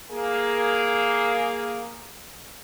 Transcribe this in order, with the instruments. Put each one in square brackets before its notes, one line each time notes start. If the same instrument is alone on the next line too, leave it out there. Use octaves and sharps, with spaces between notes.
[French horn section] A#3 G#4